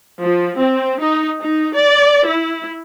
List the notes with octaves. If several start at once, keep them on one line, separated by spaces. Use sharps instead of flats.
F3
C4
D#4
D#4
D5
E4